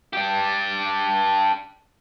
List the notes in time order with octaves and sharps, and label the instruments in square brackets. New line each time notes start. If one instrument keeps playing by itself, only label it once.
[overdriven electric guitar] D4 G4